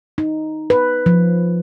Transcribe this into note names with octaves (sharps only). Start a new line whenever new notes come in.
D#4
B4
F3